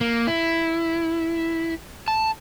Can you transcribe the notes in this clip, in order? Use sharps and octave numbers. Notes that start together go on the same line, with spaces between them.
A#3
E4
A5